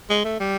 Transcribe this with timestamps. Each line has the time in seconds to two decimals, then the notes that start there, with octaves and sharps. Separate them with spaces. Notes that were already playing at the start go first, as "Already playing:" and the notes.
0.10 G#3
0.25 A3
0.40 G3